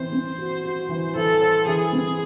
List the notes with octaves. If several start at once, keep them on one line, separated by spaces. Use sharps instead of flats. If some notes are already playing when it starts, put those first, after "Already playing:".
Already playing: E3 C4 C5
C4
F#4
F#4
E3
E3 A4
C5
E3 G#4
C4